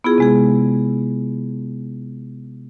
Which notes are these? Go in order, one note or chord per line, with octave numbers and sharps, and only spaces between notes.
B3 E4 F4 G#4
C3 G#3 G#4